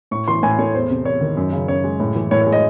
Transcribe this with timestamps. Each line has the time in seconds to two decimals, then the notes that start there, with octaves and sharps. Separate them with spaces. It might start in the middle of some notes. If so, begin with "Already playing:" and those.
0.11 A2 C#6
0.28 E3 C6
0.43 A2 G#5
0.59 A3 C#5
0.74 E2 C5
0.90 C3
1.05 E2 C#5
1.21 D#3
1.37 F#2
1.52 C#3
1.68 F#2 C#5
1.84 G#3
2.00 A2
2.15 E3
2.31 A2 C#5
2.41 C#5
2.47 G#3
2.52 D#5